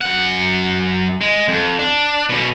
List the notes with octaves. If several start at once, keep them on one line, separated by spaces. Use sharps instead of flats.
F#2 F#5
G#3
F2
D4
B2 C#4